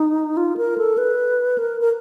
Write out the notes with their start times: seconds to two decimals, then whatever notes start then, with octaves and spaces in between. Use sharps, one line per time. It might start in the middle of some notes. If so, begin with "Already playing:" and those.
Already playing: D#4
0.37 F4
0.57 A#4
0.78 A4
0.98 B4
1.58 A#4
1.81 A#4